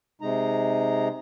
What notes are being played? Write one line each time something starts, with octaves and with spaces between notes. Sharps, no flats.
C3 G#3 D#4 A#5